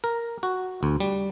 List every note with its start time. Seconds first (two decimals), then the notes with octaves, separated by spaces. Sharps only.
0.04 A#4
0.43 F#4
0.83 D2
1.00 G3